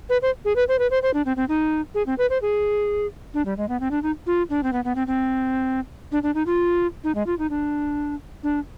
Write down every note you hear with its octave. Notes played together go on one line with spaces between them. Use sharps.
B4
C5
G#4
B4
C5
B4
C5
C5
D4
C4
C4
D#4
G#4
C4
B4
C5
G#4
D4
G3
G#3
B3
C4
D4
D#4
F4
D4
C4
B3
B3
C4
C4
D4
D4
D#4
F4
D#4
G#3
F4
D#4
D4
D4